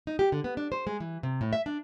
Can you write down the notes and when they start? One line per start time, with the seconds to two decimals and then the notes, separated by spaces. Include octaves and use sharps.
0.07 D#4
0.19 G4
0.32 D3
0.44 B3
0.57 D4
0.72 C5
0.87 G#3
1.00 E3
1.23 C3
1.41 A2
1.53 E5
1.66 D4